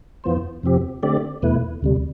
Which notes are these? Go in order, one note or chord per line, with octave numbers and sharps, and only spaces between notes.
F2 E3 B3 F4 C5
F2 C3 F3 C4 G4
D3 A3 C4 G4 D5
E2 B2 A3 E4 B4
D2 C3 G3